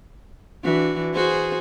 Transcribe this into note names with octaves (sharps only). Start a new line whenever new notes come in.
E3 D4 F#4
F#4 G#4 C5